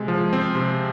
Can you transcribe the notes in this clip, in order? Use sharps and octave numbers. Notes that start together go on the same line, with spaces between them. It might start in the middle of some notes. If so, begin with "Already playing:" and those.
Already playing: C3 G#3
F3
C4
C3